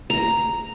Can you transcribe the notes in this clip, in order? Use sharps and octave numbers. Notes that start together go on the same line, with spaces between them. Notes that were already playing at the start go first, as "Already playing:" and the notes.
A#5